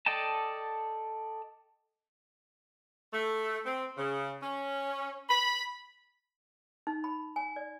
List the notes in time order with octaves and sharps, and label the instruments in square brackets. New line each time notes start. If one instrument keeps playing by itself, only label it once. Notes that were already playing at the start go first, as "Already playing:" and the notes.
[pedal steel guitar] A4 D5 D#5 G5 A5
[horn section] A3
C4
C#3
C#4
B5
[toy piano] D#4
B5
G#5
D5